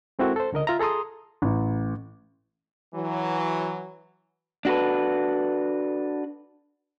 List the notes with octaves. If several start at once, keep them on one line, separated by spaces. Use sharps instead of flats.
G#3 C4 E4 F#4 A4 A#4
A4 C5
C#2 D3 A#4 D#5
F4 E5 A#5
G#4 A4 A#5 C6 D#6
A1
E3 F#3
D4 F#4 A4 B4